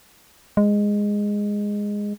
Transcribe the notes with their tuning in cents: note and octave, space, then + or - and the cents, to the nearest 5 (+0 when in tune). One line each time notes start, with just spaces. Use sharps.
G#3 -10